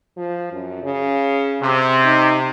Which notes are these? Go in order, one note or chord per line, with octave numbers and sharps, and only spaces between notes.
F3
F#2
C#3
C3
D#4